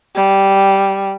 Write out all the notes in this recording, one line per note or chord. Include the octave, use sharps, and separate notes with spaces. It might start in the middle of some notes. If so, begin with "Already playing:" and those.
G3